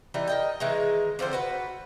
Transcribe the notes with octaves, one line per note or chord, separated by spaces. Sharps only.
E3 G3 D#4
A#4 D#5 G5
D#3 E3 G#3
D3 F3 C4 C5
F#4 B4 F#5